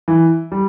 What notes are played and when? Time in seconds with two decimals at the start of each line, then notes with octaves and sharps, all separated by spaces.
0.08 E3
0.52 G3